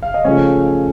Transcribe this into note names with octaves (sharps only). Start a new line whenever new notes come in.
F5
D#5
C#3 F3 A3 C#4 C#5